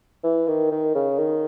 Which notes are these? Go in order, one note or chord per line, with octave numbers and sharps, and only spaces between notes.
E3
D#3
D#3
C#3
D#3